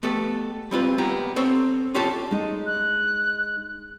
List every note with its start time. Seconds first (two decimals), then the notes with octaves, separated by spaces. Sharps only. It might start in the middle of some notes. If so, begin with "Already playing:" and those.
0.03 A3 B3 G4 A4
0.71 G3 C4 F4 B4
0.98 A#3 B3 G4 A#5
1.36 C4 A4 C5 C#5
1.94 C#4 F4 G4 A4 A5
2.31 G#3 D#4
2.66 F#6